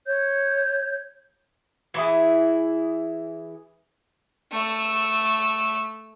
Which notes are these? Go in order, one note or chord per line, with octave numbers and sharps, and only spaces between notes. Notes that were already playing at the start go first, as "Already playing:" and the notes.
C#5 G6
E3 E4 G#4
A3 E6